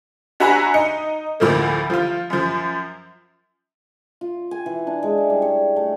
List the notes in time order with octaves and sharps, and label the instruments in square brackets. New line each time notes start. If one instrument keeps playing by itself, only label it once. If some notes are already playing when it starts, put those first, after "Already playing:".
[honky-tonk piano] D4 F#4 E5 G#5 A#5 B5
D#4 C#7
D2 A2 F3 A3 A#3
F3 F4
F#2 F3
[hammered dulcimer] F4
G#5
E3
D4
G#3
E4
G3
C#5
A3